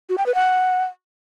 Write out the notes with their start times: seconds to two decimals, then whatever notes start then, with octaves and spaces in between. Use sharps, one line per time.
0.09 F#4
0.18 G5
0.26 B4
0.35 F#5